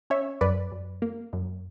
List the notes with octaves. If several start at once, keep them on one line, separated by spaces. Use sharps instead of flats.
C#4 C#5 E5
F#2 B4 D5
F#2
A#3
F#2